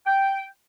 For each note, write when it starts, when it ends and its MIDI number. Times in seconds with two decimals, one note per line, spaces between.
0.07 0.46 79